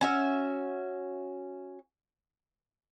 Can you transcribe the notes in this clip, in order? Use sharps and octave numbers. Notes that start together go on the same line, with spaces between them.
C#4 F#4 E5